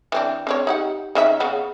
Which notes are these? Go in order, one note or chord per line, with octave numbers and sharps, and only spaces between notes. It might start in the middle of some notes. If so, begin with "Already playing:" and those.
E3 C4 D4
C4 D4 C#5
D#4 G4 F#5
C#3 D#4 E5
C#3 B3